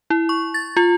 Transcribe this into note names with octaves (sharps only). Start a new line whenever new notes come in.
E4
C#6
A6
F4